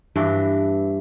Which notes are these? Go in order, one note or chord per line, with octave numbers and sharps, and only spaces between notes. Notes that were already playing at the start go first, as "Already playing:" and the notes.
G2 E3 D4